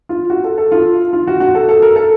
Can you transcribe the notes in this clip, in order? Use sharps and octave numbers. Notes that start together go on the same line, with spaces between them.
F4
F#4
A4
A4
F4
F4
F#4
F#4
A4
A4
A#4
A4